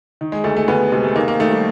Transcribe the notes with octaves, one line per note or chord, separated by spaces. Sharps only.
D#3
G#3
D2 A3
A3
D2 B3
C3 G#3
A3
D#3 A#3
A#3
D#3 A3
G3